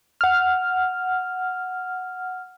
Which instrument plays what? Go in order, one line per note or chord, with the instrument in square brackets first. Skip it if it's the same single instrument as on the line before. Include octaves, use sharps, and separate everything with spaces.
[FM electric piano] F#5 F6